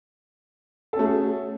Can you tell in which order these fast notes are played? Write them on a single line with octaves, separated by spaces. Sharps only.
A4 C#4 A3 F#4 G#4